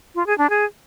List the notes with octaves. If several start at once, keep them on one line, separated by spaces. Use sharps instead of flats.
F4
G#4
D4
G#4